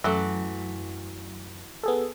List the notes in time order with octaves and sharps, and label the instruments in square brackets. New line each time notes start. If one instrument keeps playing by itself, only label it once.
[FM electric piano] F#2 [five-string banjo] E3 F#3 A3
[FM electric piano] B3 G#4 A4